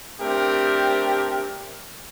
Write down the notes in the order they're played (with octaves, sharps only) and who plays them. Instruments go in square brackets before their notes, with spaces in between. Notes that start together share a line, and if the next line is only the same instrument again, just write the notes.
[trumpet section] A3 C4 D4 G4 A#4